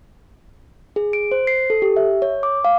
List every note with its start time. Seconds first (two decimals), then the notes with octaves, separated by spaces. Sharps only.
0.96 G#4
1.13 D7
1.31 C5
1.47 C7
1.70 A4
1.82 G4
1.96 E5
2.22 C#5
2.43 D6
2.65 F5